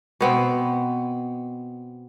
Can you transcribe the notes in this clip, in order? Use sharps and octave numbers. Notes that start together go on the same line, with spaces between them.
B2 B3 C4